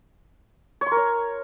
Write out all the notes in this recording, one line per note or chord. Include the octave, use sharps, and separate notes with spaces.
C#5
C6
A#4
C#5